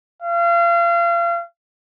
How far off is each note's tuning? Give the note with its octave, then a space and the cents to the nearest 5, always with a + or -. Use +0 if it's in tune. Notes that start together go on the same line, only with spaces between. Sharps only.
F5 -35